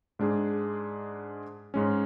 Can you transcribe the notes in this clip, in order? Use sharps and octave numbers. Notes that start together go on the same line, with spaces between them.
G#2 G#3 D4 G#4
G#2 G#3 C#4